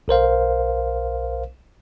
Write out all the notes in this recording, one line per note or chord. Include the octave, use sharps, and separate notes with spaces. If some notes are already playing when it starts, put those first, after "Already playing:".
B1 A#4 C5 F5